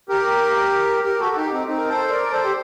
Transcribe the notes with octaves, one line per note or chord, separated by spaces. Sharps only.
G4 A#4
G4 A#4
F#4 A4
D#4 G4
C4 D#4
C4 D#4
A#4
A4 C5
A#4 D5
A4 C5
G4